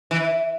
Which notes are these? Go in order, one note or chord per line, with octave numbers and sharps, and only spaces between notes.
E3